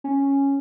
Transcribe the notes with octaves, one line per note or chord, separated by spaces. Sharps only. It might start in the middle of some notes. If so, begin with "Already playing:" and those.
C#4